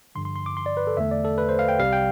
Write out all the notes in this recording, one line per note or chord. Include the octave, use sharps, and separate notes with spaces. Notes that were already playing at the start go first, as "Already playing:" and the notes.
G2 D3 F3 C6
C6
C6
D6
C6
D5
B4
A4
E2 D3 A3 E5
D5
A4
B4
C5
F5
G5
C2 C3 G3 F5
G5